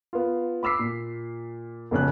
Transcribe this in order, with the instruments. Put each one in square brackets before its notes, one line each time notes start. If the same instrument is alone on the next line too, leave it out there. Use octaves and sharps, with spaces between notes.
[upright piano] B3 F4
B5 D6 E6 B6 C7
A#2
F1 F2 C#3 F#6